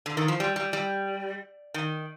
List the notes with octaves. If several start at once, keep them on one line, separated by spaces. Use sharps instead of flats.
D3
D#3
F3
G3
G3
G3
D#3